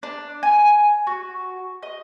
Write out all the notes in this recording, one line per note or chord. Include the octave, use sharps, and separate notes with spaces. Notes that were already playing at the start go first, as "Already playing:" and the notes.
D4
G#5
F#4
D#5